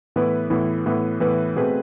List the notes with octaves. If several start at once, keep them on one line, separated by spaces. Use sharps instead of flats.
A2 E3 B3 E4 B4
A2 E3 B3 E4 B4
A2 E3 B3 E4 B4
A2 E3 B3 E4 B4
B2 A3 C4 G#4 B4